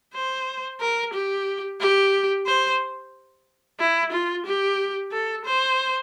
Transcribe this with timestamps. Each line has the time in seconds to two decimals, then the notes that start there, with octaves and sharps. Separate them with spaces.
0.14 C5
0.80 A#4
1.14 G4
1.80 G4
2.46 C5
3.80 E4
4.12 F4
4.46 G4
5.12 A4
5.45 C5